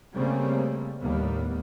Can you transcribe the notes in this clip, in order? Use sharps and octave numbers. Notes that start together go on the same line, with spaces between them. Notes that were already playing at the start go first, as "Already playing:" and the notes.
C#3 G3 A3 A#3 C4 C#4
D#2 A2 G3 A#3 B3